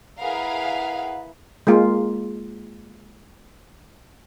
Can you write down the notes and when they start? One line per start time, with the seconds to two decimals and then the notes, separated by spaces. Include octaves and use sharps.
0.20 E4 G#4 A#4 B4 F5 F#5
1.67 G#3 A#3 F4